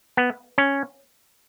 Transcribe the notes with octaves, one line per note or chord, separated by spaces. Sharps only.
B3
C#4